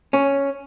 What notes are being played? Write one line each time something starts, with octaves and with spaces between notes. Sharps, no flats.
C#4